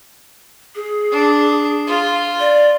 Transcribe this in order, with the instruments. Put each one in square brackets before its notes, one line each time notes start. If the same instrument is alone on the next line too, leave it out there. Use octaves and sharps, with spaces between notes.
[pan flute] G#4
[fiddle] D4
F4
[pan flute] D5